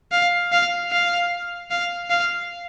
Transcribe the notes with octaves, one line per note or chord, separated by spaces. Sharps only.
F5
F5
F5
F5
F5